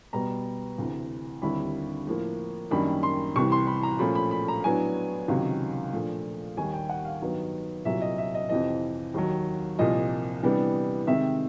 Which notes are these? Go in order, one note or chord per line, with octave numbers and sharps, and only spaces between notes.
B2 G3 B3 A#5
D2 C3 E3
D#2 D3 G3 C4 E4 B5
A2 F3 A#3
F#2 D#3 G3 A#3 D4 B5
C6
C2 C3 E3 G3 C#6
C6
B5
A#5
A#2 F3 A3 C#4 B5
B5
B5
A#5
A2 F#3 B3 D4 G#5
C#2 C3 D#3 F#3
A#2 F3 A3 D4
D#2 D#3 G3 G#5
G5
F#5
F5
G2 D#3 F#3 B3
C2 A#2 F#3 E5
D#5
E5
D#5
F2 C3 E3 D#5
D#2 D#3 F#3
C2 A#2 F3 D#5
C3 E3 G3 B3 D4
C3 D#3 G#3 C4 E5